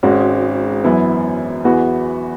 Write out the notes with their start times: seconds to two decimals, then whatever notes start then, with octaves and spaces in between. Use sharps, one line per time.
0.03 G#1 G#2 G#3 C#4 F#4
0.84 F#2 E3 B3 E4
1.64 E2 E3 B3 F#4